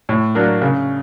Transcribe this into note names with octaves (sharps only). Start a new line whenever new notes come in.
A2
F#3 A#3 D4
C#3